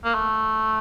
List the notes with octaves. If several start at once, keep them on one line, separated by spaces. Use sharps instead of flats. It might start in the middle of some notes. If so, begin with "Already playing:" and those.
A#3
A3